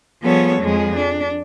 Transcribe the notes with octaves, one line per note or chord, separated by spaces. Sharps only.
F3 G3 B3 G#4 A4 C#5
F2 F3 G#3 G#4
D4